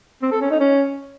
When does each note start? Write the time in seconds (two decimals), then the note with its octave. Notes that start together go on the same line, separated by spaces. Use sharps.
0.22 C4
0.32 A4
0.41 C#4
0.51 D#4
0.60 C#4